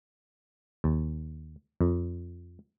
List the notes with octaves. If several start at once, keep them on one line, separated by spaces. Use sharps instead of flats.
D#2
F2